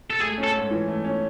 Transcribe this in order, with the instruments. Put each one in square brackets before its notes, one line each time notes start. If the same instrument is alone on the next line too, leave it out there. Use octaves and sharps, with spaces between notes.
[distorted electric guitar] A4
[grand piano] A3 [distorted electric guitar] G#4
[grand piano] C#4
[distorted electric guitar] A4
[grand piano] G#2
E3
A3
C#4